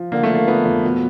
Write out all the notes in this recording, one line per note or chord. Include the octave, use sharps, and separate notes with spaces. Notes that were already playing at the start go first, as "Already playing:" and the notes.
Already playing: F3
D3 A#3
A3
F3
A#3
F3 B3
F2
B2